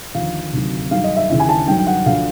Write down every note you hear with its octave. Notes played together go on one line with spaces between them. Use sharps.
D#2 D3 F3 F5
D2 C3 D#3 F#3
G2 D#3 F#3 F5
D#5
E5
D#2 C#3 E3 E5
G#5
A5
G2 D#3 F#3 G5
G5
F#5
D2 D3 F3 F5